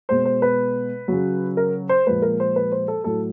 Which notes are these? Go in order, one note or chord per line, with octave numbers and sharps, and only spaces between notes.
B2 G#3 C5
C5
B4
C#3 F#3
A#4
C5
A#2 F3 G#3 B4
A#4
C5
B4
C5
A4
A2 F#3 A4